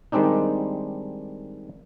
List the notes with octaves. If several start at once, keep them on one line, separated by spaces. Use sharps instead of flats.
D#3 G3 G#3 C4 D4 D#4